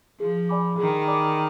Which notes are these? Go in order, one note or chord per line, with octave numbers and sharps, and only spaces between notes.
F3 G#4
D5 G#5 B5 D6
D#3 G#4
D5 G#5 B5 D6